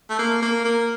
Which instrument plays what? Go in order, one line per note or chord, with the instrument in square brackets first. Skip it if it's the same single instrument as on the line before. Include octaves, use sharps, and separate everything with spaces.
[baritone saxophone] A3
A#3
A#3
A#3